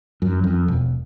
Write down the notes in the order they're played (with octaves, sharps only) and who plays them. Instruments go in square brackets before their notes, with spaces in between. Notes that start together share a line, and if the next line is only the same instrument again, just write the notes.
[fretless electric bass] F#2
F2
E1